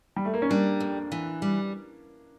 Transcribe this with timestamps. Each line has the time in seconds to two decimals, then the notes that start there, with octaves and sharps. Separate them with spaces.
0.16 G3
0.25 A3
0.34 A#3
0.42 C#4
0.49 G3 A#3 D4
0.80 F2
1.12 E3
1.42 G3